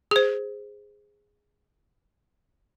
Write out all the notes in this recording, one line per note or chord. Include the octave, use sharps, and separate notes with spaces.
G#4 C5